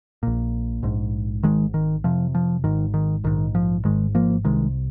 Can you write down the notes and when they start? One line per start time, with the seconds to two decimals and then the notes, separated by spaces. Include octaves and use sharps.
0.23 A#1 A#2
0.83 A#1 G#2
1.43 G#1 G#2 D#3 G#3
1.74 D#3
2.04 F1 F2 C3 F3
2.35 F3
2.64 G#1 G#2 D#3
2.94 D#3
3.24 A#1 G#2 D#3
3.55 F3
3.85 G#1 G#2 D#3 G#3
4.15 F3 A#3
4.45 C2 C3 D#3 G#3